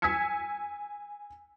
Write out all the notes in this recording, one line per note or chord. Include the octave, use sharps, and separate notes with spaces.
G#5 E6 G#6 B6 C#7